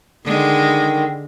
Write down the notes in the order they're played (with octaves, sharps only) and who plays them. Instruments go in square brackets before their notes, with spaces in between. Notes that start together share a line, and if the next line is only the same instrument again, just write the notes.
[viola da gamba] D3 G#3 [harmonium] D#3